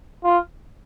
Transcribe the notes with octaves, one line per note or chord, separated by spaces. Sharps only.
F4